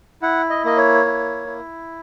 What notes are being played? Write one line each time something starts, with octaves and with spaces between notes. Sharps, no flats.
E4 F#5
D#5
A#3 D#5
C#5
E4
E4